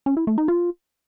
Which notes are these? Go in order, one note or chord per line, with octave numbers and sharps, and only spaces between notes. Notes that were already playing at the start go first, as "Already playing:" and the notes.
C#4
E4
A3
D#4
F4